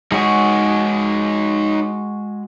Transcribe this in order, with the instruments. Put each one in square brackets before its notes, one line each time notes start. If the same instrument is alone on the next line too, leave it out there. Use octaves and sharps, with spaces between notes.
[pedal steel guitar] G#3 F#4 G#4 [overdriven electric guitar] D#4 C#5